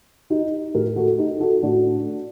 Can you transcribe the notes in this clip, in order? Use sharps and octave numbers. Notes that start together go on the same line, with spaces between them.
D#4 G4
A2 G4 A#4
F#4 A4
D#4 G4
F#4 A4
A2 D4 F#4